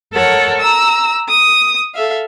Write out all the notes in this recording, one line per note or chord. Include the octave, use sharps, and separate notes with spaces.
A4 A#4 C#5 F#5
A#5 E6
D#6
A4 E5 F5